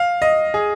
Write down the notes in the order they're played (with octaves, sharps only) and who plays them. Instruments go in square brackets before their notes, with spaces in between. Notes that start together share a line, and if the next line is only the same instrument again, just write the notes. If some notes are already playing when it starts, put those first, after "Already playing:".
Already playing: [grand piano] F5
D#5
G#4